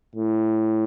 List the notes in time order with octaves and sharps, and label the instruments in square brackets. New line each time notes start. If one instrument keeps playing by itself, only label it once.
[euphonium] A2